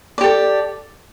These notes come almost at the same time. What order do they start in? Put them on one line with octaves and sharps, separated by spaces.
D5 G4 A4